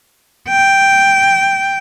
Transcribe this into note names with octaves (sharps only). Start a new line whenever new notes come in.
G5